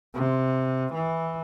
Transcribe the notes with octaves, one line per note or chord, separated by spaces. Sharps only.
C3
E3